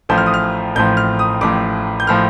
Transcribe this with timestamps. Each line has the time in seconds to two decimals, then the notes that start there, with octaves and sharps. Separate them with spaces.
0.09 A1 A2 F3 G6
0.18 F6
0.26 D#6
0.34 F6
0.75 A1 A2 F3 G6
0.97 F6
1.19 D#6
1.41 A1 A2 F3 D6
2.00 G6
2.07 A2 F3 F6